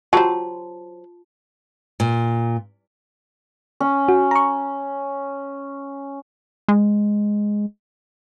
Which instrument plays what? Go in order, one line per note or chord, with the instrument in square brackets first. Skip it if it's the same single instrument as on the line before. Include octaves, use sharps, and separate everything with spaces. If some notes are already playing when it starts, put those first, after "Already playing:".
[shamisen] F#3 G4 C5 [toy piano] F4 A5 C6
[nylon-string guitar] A#2
[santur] C#4
[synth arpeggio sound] F#4
A#5 C#6
[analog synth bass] G#3